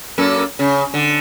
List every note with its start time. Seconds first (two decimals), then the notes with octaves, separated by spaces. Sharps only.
0.18 F#2 A#3 A4
0.59 C#3
0.94 D3